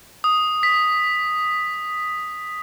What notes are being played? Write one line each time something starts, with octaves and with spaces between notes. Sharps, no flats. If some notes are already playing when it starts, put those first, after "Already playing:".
D#6
B6